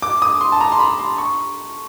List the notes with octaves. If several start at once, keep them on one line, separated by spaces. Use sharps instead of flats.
D6
D#6
C6
A5
A#5
C6
B5
C6
C#6